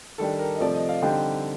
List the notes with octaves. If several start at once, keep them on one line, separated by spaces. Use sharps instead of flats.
D#3 G3 D4 A4
A#4
D#5
C3 F3 A3 D5
D#5
F5
D3 G3 C4 D#4 G5